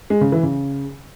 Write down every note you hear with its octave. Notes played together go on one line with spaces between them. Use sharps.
G#3
C#3
E3
C#3